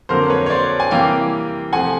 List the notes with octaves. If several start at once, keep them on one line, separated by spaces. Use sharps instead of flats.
F2 D3 F#3 A#3 A#4 C5
B4 C#5
C#5
C5 D5
G#5
C3 E3 G3 A#3 F5 G5
C3 F3 A3 F#5 G#5